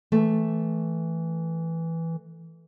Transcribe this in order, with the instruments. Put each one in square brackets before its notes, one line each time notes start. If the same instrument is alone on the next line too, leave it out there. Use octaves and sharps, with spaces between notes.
[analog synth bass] E3 [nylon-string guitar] A3